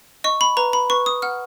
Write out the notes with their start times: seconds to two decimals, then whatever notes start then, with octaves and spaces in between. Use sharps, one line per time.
0.24 D#5 C#6
0.41 B5
0.57 B4 A#5
0.73 B5
0.90 B4 C#6
1.06 D#6
1.22 F#5 F6